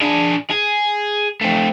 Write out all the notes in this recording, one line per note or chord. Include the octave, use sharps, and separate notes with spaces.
D4 G#4
G#4
A3 C4